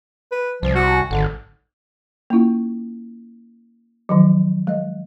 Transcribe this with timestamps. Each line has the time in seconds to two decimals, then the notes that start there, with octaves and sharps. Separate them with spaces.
0.32 B4
0.62 C2 F3
0.75 F#4
1.11 G#1 D3
2.30 A#3 C#4 E4 F4
4.09 D#3 F3 F#3
4.67 G#3 D#5